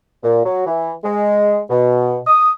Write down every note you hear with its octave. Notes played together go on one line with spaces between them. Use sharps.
A#2
F#3
E3
G#3
B2
D#6